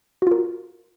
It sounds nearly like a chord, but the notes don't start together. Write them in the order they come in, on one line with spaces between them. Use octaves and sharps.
F#4 F4 A#4